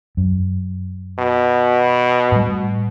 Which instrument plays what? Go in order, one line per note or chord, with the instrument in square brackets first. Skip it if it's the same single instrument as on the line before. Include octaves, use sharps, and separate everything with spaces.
[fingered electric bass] F#2
[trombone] B2
[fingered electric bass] A2 G3